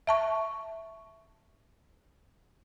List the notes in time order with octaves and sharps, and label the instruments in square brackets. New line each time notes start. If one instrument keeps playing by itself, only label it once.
[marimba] E5 A5 C#6